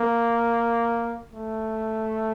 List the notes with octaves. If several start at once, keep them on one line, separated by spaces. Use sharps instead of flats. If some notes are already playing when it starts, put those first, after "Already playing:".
Already playing: A#3
A3